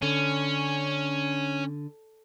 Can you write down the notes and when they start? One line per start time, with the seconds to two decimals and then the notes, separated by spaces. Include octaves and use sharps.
0.02 D3 C#4